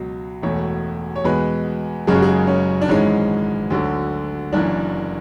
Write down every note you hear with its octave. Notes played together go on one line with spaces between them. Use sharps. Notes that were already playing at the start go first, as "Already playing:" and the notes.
Already playing: C#2 B2 F#3
E1 E2 B2 A3 C#5
C#5
E2 B2 G#3 B4
F#1 F#2 C#3 G#3 G#4
F#4
G#4
C#4
D4
G#1 G#2 E3 G#3 C#4
D2 D3 F#3
F#1 F#2 E3 D4